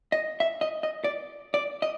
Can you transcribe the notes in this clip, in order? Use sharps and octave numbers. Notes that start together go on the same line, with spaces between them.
D#5
E5
D#5
D#5
D5
D5
D#5